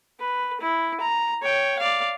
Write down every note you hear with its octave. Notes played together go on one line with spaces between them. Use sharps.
B4
E4
A#5
C#5 G5
D5 F5